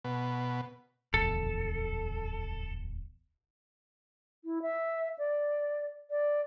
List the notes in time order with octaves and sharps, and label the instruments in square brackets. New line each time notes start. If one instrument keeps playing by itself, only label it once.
[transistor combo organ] B2
[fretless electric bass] D1 A#1 E2 [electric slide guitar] A4
[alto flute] E4
E5
D5
D5